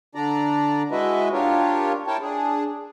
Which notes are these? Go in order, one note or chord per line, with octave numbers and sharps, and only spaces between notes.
D3 D4 D5 A#5
G#3 E4 F#4 B4 D#5 E5
D4 F4 G4 A#4 C#5
E4 A#4 C#5 G5 A5
D4 G#4